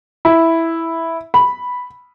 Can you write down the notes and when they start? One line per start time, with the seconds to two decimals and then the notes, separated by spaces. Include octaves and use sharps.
0.25 E4
1.34 B5